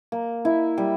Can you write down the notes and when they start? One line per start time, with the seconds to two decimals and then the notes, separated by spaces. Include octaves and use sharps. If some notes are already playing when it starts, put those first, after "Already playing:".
0.12 A#3
0.45 E4
0.78 G3